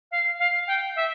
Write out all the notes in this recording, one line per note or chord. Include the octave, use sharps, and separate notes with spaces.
F5
F5
G5
E5